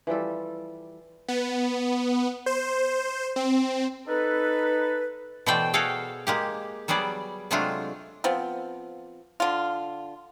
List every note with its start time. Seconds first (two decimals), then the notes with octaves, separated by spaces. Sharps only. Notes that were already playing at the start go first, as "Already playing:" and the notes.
0.07 E3 F3 G3 A4
1.28 B3
2.46 C5
3.36 C4
4.07 D#4 A4 B4
5.46 B2 E3 A3 C5 D5 G5
5.74 F#4 G#4 A4 F5 G5
6.27 G#3 A#3 G4
6.88 F#3 G3 B3 G#4 D5
7.51 C3 F#3 G#3 A3 D4 F4
8.24 F3 B3 C4
9.40 D3 F4